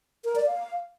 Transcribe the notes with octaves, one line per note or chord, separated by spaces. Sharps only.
A#4
D5
F5